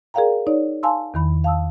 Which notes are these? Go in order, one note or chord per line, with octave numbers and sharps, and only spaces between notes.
G#4 A#4 D5 F5 G5 A#5
D#4 C#5 D5
F5 G#5 A5 C6 E6
E2 D#3 B5
F5 A5 D#6 E6